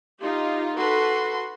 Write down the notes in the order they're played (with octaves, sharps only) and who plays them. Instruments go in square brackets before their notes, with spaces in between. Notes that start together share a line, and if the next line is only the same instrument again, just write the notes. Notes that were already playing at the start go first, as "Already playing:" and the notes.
[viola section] D#4 F4 G4
[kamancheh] F#4 C6 [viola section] A4 B4